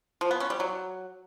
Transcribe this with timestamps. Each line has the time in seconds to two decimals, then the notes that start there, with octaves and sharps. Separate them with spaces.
0.21 F3
0.31 B3
0.40 C#4
0.50 G3
0.60 F#3